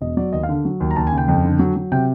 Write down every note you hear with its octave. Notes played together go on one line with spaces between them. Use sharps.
E1 D#5
F#3 D5
D#2 D#5
F5
D3
F#3
D#2
A#5
D#2 A5
G#5
C#3
G5
F2
D3
F#3
F#3
C3 G5